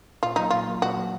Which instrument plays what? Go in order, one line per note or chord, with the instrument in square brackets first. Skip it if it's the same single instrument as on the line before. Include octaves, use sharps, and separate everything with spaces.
[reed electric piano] A#2 [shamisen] F4
[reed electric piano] F#3 A#3 [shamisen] D#4
[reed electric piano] A#2 [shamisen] F4
[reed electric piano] F#3 A#3
[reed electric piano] A#2 [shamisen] F#4
[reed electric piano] F#3 A#3